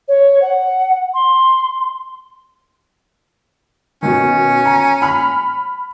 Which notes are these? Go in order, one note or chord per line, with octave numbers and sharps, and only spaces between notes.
C#5
F#5
C6
B2 D#3 C#4
A#5
B5 F6